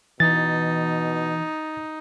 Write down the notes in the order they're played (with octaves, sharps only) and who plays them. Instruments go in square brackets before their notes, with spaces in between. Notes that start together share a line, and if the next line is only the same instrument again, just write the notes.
[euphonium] B2 [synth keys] E3 [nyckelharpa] D#4 [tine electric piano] A6